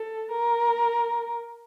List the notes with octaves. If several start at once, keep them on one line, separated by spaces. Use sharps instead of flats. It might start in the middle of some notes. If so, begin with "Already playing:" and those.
Already playing: A4
A#4